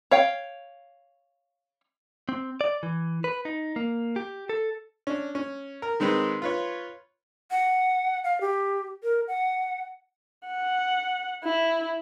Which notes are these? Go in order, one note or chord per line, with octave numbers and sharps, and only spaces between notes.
C#5 F5 G5
C4
D5
E3
B4
D#4
A#3
G4
A4
C#4 D4
C#4
A#4
D#3 G#3 C4 D#4 B4
F4 B4 C#5
F#5
F5
G4
A#4
F#5
F#5
E4